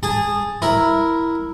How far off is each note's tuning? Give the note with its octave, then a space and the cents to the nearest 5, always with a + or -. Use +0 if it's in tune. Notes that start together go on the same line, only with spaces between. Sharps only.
G#4 -15 A5 +0
E4 +0 A#4 +0